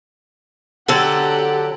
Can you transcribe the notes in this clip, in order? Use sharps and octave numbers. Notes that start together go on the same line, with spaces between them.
D3 F#3 G4 A4 F#5